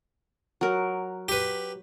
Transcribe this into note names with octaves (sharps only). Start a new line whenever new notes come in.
F#3 A#4
G4 B4